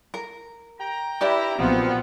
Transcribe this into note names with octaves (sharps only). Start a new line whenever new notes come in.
A#4
G5 A#5
E4 G4 B4 D5
B1 A#2 F3 B3 C4